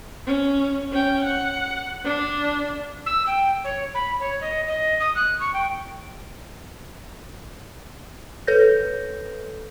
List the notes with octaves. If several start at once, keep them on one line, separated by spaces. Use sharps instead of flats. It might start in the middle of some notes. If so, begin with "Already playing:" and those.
C#4
C#4 G5
F#5
D4
E6
G5
C#5
B5
C#5
D#5
D#5
D#6
F#6
C#6
G5
A4 B4 C#5 G6 A#6